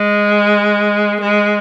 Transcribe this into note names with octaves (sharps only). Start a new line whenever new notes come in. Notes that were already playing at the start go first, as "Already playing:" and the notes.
Already playing: G#3
G#3